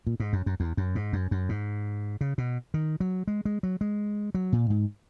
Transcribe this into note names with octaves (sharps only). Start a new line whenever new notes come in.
A#2
G#2
F#2
F#2
E2
F#2
G#2
F#2
F#2
G#2
C#3
B2
D#3
F#3
G#3
G#3
F#3
G#3
F#3
A#2
G#2